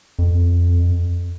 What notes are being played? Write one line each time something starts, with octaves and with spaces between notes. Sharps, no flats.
F2